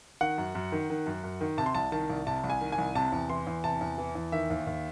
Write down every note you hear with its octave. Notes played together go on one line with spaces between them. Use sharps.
D#3 F#5
F#2
F#2
D#3
D#3
F#2
F#2
D#3
C3 A5
C6
C2 A5
D#3 A5
C2
C3 A5
C2
G#5
D#3
G#5
C2
C3 A5
E2
E3 C6
E2
C3 A5
E2
E3
E2
D#3 E5
D#2
D#2